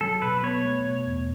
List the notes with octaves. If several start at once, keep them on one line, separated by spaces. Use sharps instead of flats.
F#3 A4
B2 B4
B3 C#5
A3
B2
E2